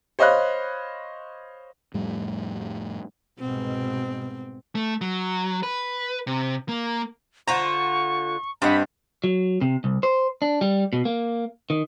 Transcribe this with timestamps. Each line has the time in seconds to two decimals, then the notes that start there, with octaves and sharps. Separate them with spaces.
0.19 C5 C#5 D#5 F5 B5 F#6
1.94 F2 A2 G3
3.40 C2 G#2 B2 C4
4.75 A3
5.01 F#3
5.63 B4
6.27 C3
6.69 A#3
7.48 D3 F4 C5 A#5 C#6
8.62 G2 C4 D#5 F#5 B5
9.24 F#3
9.61 C3
9.84 C2
10.03 C5
10.42 D4
10.61 G3
10.93 B2
11.05 A#3
11.70 D#3